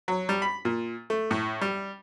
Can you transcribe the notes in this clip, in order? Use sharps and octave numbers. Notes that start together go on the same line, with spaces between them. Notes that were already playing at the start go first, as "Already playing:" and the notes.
F#3
G3
B5
A#2
A3
A2
G3